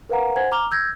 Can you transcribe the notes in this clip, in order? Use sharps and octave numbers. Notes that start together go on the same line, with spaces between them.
A#4 B4 F5 F#5 A#5
C5 F#5 G#5 G#6
A#5 D6 F6 F7 G7
E6 G6 G#6 A#6